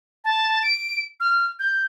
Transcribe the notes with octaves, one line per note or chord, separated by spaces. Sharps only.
A5
D7
F6
G6